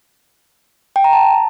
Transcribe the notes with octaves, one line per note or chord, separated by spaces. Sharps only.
G5
A#5
A5